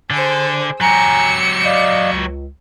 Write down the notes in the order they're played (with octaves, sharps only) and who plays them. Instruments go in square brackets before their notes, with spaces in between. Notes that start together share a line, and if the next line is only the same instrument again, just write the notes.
[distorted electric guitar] D3 [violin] G#4 C5
[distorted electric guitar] F#3 G4 [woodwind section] G#5 A#5 [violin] E6 C#7
[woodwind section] D5 D#5 F5
C#2